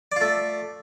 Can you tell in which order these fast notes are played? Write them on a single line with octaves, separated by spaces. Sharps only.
D5 F4 A3